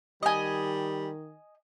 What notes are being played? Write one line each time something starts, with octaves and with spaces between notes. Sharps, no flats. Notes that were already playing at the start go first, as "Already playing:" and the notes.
D#3 G3 D#5 G#5